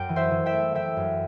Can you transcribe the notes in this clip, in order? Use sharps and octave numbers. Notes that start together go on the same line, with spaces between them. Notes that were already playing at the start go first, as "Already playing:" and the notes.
Already playing: F#2 G5
E3
C5 E5
E3
E5 G5
A3
E3 E5 G5
F#2